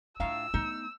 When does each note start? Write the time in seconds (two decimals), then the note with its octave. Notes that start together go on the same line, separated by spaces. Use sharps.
0.20 A2 D4 F4 F5 A#5 E6
0.54 A3 B3 D#4